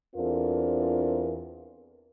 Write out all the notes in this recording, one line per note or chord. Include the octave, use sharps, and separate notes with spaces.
E2 C4 D4 F4 A4 A#4